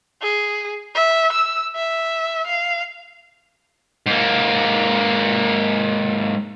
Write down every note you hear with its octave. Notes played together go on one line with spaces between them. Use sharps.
G#4
E5
E6
E5
F5
G#2 A#3